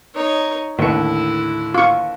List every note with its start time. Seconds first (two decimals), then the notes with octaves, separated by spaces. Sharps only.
0.15 D#4 C#5
0.79 D#2 A2 D3 E4 C#7
1.74 F4 C#6